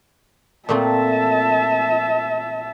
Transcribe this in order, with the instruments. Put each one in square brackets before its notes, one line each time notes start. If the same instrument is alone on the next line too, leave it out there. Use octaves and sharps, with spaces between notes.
[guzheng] A#2 A3 C4 [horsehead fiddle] E5 A5